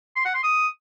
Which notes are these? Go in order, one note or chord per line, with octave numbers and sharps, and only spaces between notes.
C6
F#5
C6
D#6